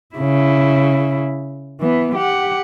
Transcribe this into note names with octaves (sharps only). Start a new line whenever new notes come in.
C#3 E4
E3 B3
G4 F#5